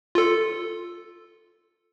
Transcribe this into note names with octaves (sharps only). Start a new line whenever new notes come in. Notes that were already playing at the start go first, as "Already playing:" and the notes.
F4 A4